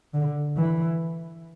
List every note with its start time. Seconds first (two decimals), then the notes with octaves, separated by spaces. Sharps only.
0.14 D3
0.57 E3